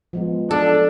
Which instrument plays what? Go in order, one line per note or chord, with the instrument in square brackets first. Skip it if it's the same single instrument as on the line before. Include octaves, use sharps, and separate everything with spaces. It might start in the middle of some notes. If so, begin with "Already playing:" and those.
[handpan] F3 G#3 B3
[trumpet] D4 [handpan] F4 [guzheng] A4